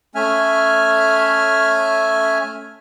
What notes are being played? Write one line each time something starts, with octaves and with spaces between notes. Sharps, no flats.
A3 C#4 E5 G#5 F6